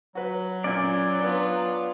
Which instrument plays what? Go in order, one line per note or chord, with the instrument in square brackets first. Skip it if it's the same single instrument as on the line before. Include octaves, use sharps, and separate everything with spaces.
[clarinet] F#3 [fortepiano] F#4 B4
[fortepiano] F#2 A#2 [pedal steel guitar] D5 G#5
[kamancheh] B3 F4 [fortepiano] D4